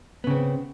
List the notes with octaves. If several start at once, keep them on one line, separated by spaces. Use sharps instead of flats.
C#3 B3 C4